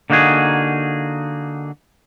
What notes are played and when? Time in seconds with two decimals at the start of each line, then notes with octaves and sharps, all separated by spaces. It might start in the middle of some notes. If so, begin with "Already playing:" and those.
0.10 D3 A#3 D#4 F#4 G#4